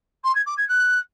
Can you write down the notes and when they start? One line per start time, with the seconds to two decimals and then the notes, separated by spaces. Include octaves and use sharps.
0.24 C6
0.35 G#6
0.46 D6
0.57 G#6
0.68 F#6